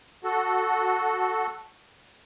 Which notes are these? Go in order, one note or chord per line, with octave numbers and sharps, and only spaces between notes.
F#4 A4